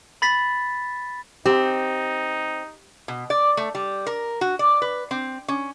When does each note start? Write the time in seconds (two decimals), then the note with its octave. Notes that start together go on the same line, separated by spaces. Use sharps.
0.22 B5 A6 B6
1.46 C4 D#4 G4
3.08 B2
3.30 D5
3.57 A3
3.75 G3
4.07 A#4
4.41 F#4
4.59 D5
4.82 B4
5.11 C4
5.48 C#4